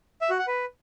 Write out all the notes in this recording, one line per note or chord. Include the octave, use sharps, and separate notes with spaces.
E5
F#4
F#5
B4